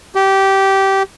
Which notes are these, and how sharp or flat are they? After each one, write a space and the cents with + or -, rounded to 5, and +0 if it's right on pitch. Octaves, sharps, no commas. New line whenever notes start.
G4 -15